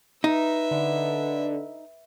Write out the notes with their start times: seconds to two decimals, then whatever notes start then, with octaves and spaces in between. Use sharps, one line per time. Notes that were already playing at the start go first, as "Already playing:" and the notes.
0.24 D#4 B4 E5
0.71 D3